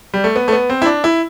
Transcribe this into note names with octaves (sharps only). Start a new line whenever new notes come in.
G3
A3
B3
A3
B3
C4
E4
D4
E4